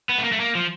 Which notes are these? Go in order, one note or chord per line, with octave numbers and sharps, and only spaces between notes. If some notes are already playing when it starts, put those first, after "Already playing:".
B3
A3
A#3
A3
A#3
F3